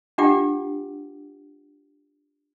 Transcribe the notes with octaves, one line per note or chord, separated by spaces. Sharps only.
D4 F4 G4 F#5 G5 D6